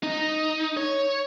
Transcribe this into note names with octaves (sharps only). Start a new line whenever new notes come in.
D#4
C#5